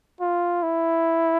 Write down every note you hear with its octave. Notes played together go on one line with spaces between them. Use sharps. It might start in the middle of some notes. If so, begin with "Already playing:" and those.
F4
E4